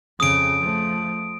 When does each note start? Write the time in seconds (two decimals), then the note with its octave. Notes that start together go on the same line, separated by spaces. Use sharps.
0.20 F2 C#3 D#6 D7
0.61 F3 A3